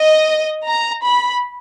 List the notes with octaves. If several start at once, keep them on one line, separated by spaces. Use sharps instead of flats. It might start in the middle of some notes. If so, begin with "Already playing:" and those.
Already playing: D#5
A#5
B5